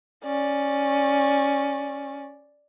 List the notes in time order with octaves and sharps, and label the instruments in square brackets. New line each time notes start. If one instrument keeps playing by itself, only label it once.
[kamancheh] C#4 D5